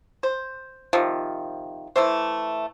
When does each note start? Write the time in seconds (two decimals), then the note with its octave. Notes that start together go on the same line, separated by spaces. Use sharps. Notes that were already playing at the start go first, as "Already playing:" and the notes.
0.23 C5
0.93 C3 D#3 F3
1.96 E3 A3 C5